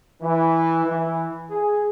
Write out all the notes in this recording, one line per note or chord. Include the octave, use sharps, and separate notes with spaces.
E3
E3
G#4